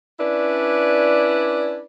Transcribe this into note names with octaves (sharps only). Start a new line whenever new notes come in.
C#4 D4 E4 B4 D5